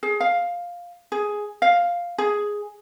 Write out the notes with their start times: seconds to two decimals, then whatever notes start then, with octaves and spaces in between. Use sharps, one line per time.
0.03 G#4
0.20 F5
1.12 G#4
1.62 F5
2.18 G#4